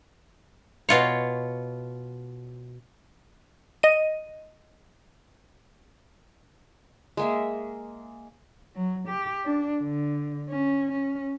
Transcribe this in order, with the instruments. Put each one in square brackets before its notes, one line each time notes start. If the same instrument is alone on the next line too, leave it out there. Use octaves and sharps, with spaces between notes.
[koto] B2 F4 C#5
[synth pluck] D#5 D#7
[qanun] G#3 A#3 E5
[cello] F#3
G4
D4
D3
C#4
C#4